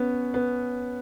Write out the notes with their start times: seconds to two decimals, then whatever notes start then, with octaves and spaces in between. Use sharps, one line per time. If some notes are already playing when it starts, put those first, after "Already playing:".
Already playing: B3 C#4
0.34 B3